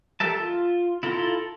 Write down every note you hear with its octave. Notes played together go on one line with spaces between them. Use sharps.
G4 A4 A#4 E5 A5
F4
E4 F4 A4 A#5 C6